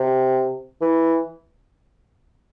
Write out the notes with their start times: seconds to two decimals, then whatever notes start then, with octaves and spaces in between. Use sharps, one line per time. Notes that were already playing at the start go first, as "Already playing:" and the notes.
Already playing: C3
0.81 E3